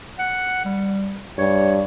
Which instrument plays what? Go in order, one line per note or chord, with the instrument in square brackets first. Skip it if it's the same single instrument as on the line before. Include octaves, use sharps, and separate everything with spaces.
[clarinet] F#5
G3
[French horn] G2 [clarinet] C#5